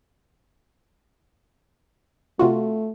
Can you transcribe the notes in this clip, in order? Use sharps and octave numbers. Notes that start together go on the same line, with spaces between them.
C3 A3 F4 F#4